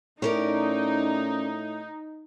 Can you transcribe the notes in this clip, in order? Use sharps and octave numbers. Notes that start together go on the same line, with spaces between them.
A2 C#4 D#4 A#4 D5